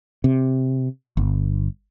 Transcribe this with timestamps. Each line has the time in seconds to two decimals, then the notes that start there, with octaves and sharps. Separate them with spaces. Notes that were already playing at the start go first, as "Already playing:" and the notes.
0.24 C3
1.17 G1